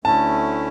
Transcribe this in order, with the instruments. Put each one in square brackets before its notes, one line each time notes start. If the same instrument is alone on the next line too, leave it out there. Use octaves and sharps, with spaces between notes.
[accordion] D2 D3 A3 C#4 E4 [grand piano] A5